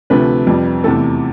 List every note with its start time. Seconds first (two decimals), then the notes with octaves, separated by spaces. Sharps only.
0.10 D2 C3 F3 A3 B4
0.47 F2 C3 G3
0.84 E2 C3 E3 A3 A4